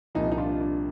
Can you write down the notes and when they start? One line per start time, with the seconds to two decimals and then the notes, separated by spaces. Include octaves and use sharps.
0.15 C2 A#2 F3 D#4
0.32 D#4
0.38 D4 F4
0.61 D4